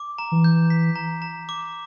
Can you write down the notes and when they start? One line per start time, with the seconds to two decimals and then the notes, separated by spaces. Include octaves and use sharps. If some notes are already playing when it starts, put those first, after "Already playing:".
Already playing: D6
0.18 A#5
0.32 E3
0.44 G6
0.70 B6
0.95 A#5
1.22 A#5
1.49 D6